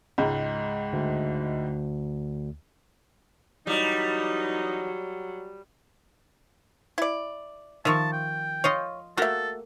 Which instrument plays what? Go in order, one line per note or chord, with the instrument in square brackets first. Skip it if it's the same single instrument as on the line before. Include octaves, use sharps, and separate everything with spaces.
[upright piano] C#2 G#2
[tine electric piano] D2
[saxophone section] E3 D#4 [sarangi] F#3 [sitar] G3
[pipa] E4 D5
[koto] D#3 F3 [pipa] E5 A#5 C#6 [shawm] A5
[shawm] G5
[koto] F4 D#5 F5 [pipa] C#5
[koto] A3 A#3 G4 [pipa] F#4 E5 [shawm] A4